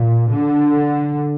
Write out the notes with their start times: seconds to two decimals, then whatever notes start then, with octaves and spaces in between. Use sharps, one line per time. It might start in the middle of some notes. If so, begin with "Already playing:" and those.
Already playing: A#2
0.30 D3